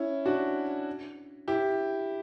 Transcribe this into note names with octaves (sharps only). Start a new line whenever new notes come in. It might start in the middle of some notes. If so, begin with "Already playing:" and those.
Already playing: C#4 E4
D4 F#4
E4 G4